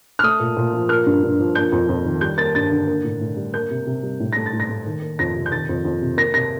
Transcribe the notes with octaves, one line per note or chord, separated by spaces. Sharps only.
F6
A3 D#6
A#2
A#2
F3
A#3 F6
G2
G2
F3
A#3 G6
F2
F2
D#3
G3 G6
A#3 A6
G2 A6
D3
A#3
A2
A2
G3
A#3 G6
C3
C3
G3
A2
A3 A#6
A6
A2
A#6
A3
D#3
A#3
F2 A#6
C3
G6
D#3 A6
F2
F2
C3
A#3 A#6
C3 A#6